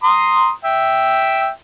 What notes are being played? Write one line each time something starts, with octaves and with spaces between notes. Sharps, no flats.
A#5 C6 D#6
E5 G5